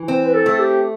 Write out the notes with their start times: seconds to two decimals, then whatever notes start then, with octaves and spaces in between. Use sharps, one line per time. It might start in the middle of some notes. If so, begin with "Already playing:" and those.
Already playing: E3
0.08 C4 C5
0.25 B4
0.34 A4
0.46 A3 A4
0.59 G4